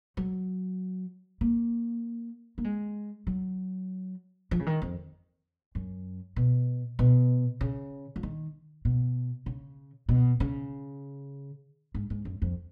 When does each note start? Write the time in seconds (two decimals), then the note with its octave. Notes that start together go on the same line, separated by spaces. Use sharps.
0.17 F#3
1.41 A#3
2.58 A#3
2.64 G#3
3.27 F#3
4.51 F3
4.59 C#3
4.66 D#3
4.82 F2
5.75 F#2
6.36 B2
6.99 B2
7.61 C#3
8.16 F3
8.23 D#3
8.85 B2
9.46 C#3
10.09 B2
10.40 C#3
11.95 G#2
12.10 G#2
12.25 F#2
12.42 F2